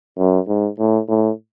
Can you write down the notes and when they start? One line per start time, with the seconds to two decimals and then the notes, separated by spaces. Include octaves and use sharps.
0.18 F#2
0.48 G#2
0.79 A2
1.09 A2